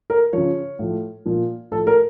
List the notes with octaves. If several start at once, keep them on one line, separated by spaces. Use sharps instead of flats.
A#4
C#3 F3 C#5
A2 F3
A#2 F3
A2 F3 A4
A#4